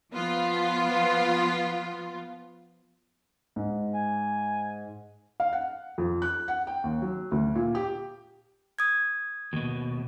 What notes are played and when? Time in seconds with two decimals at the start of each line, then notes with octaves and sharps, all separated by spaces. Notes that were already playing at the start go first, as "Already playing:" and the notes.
0.12 F3 B3 F4
3.56 G#2
3.94 G#5
5.40 F5
5.53 F#5
5.98 F2
6.22 F#6
6.48 F#5
6.67 G5
6.84 D#2
7.02 F#3
7.32 D2
7.55 A#2
7.75 G4
8.79 D#6 G#6
9.53 D#2 B2